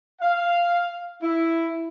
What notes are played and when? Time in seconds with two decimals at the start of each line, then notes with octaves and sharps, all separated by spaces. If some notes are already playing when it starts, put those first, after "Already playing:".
0.21 F5
1.22 E4